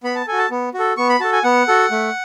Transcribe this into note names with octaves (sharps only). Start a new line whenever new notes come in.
B3 B5
A5
F#4 A4 G#5
A5
B3
F#4
A4
B3 C#6
B5
F#4 A4 A5
G#5
B3 F#5
F#4 A4
A3